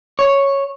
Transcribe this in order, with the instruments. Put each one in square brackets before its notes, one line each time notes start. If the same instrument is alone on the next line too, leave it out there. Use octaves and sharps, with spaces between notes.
[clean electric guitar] C#5